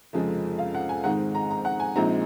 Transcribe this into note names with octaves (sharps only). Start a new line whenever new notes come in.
F1 F2 C#3 F3 G#3
F5
F#5
G#5
G#2 D#3 G#3 C4 D#4 F#5
A#5
A#5
F#5
G#5
A#1 A#2 G#3 C4 D#4 A#5